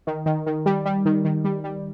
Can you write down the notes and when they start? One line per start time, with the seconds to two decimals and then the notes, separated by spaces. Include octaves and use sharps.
0.07 D#3
0.26 D#3
0.46 D#3
0.66 G3
0.85 G3
1.05 D#3
1.25 D#3
1.44 G3
1.64 G3